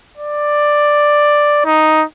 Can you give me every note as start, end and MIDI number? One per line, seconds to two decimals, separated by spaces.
0.18 1.63 74
1.65 2.04 63